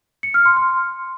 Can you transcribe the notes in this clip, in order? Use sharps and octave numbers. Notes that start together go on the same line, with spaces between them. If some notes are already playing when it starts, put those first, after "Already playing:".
C#7
F6
C6
C6